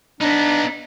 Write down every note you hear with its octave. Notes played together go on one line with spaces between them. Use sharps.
B3 D4 D#4